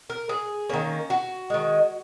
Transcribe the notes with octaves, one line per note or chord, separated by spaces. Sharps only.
A#4
G#4
D#3 A#3 C#4
F#4
D#3 G#3